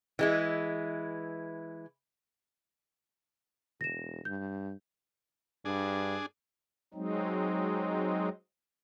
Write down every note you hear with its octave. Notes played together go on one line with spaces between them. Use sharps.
E3 G#3 E4
E1 A#6 E7
G2 G6
G2 D4 G#4
F#3 G#3 C4 D#4